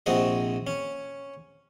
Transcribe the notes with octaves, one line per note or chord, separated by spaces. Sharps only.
A#1 C3 C4 F#4 D#5
C#4